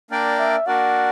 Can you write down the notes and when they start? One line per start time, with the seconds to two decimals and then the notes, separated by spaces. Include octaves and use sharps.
0.11 A#3 D4 A#4 D5 G5
0.39 E5
0.67 A#3 D4 F#4 A#4 D5 F#5